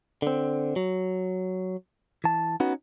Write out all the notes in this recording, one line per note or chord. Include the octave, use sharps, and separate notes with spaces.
D3 C4
F#3
E3 A5
B3 C#4 D#4 F#4